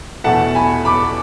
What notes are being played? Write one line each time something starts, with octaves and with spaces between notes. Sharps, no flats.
E2 B2 A3 E4 F#5 A5
G#5 B5
B5 D6